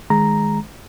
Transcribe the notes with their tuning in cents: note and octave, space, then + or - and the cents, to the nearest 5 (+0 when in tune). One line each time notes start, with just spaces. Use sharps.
D#3 +0 G#3 +5 A#5 +0